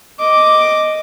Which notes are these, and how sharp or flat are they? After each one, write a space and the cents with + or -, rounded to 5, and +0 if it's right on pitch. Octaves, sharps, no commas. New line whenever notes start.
D#5 +0 D6 +0